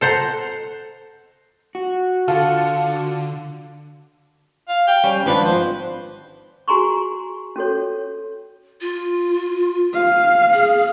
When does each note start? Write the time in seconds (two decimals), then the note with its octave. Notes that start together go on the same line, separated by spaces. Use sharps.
0.01 A4 C5 F#5 A#5
1.75 F#4
2.28 D3 F4 A4
4.69 F5
4.88 G5
5.04 G3 C#4
5.26 G#1 F3 D4 B4
5.45 C5
6.68 F#4 G#4 G#5 A#5 C6 C#6
7.56 C#4 F#4 A4 C#5
8.81 F4
9.94 F5
10.53 G#4